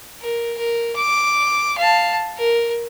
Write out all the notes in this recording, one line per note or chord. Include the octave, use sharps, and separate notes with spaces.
A#4
A#4
D6
F5 A5
A#4